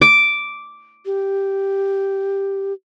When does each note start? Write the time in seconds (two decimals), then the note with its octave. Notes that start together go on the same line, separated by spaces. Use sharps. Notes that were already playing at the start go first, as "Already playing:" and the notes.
0.01 D6
1.06 G4